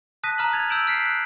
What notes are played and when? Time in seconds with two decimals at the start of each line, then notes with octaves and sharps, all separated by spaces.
0.23 A5 D#6 F#6 A#6 B6 D#7
0.38 A#5 F6 F#7
0.53 A#5 G#6 A6 F7
0.70 E6 F6 G6 D7 E7 F#7
0.87 F6 B6 C7 D7
1.06 F#6